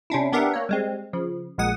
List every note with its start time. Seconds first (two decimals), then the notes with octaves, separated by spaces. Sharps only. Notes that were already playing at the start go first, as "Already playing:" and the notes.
0.10 C3 C#4 D4 E4
0.33 B3 D4 G4 A#4 E5 F#5
0.54 A#3 C#5
0.69 G3 G#3 C4
1.13 C#3 F3
1.58 A#1 A#2 G#3 F#5 D#6